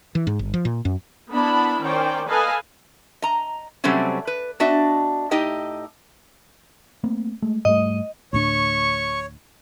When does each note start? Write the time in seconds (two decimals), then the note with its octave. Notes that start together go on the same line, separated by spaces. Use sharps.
0.15 E3
0.27 G#2
0.39 G1
0.54 F3
0.65 A#2
0.85 F#2
1.31 B3 D4 E4 A#4 A5 B5
1.83 D#3 C#4 C5 D5 G5
2.28 A4 B4 D#5 F5 G#5 A5
3.22 D#5 A#5
3.84 C3 F#3 G3 A3 C4 C#4
4.27 B4
4.60 B3 D4 F#4 D#5 E5
5.31 A2 D#4 G4 D#5 G5
7.04 A3 A#3 C4
7.42 G#3 A3
7.65 G#2 G3 A3 D#5
8.33 D2 A2 D4 C#5 C#6